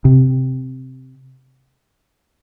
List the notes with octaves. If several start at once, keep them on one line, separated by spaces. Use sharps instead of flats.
C3